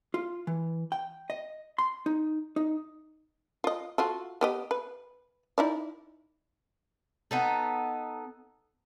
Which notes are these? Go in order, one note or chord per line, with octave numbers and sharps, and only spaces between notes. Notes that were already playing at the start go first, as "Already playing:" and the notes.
F4
E3
G5
D#5
C6
D#4
D#4
F4 D#5
F4 F#4 A4
B3 G4 D#5
B4
D#4 E4 D5
B3 D#4 A4